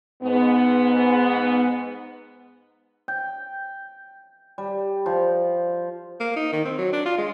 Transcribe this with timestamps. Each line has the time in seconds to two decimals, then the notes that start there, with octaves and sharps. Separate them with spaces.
0.23 G#2 B3
3.08 G5
4.58 G3
5.06 F3
6.20 A#3
6.36 D#4
6.53 D#3
6.65 C4
6.78 F#3
6.92 D4
7.05 F4
7.18 G#3